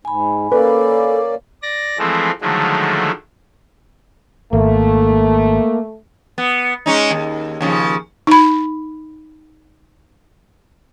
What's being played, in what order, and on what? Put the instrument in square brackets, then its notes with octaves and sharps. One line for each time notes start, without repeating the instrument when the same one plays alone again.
[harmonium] G#2 [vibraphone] G#5 B5
[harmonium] A#3 C#4 D5 [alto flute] A4 [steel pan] B4
[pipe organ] D5 A#6
E3 F3 G#3 A3 C4
D3 D#3 F3 F#3 G#3 A3
[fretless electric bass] G#1 [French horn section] A3 [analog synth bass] A#3
[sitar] B3
G#3 C#4 D#4
D#2
D#2 C#3 F3
[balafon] D#4 B5